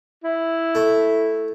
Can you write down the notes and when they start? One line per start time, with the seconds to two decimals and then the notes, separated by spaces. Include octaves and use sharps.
0.24 E4
0.75 A3